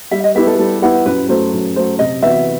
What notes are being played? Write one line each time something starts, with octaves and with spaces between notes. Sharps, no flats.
G3 E5
D#5
B3 E4 G4 B4 E5
A4
G3 A4
B3 E4 G4 B4 F#5
F#2 B4
F#3 A3 C5
F#2
F#3 A3 C5
C3 D#5
E3 B3 F#4 B4 E5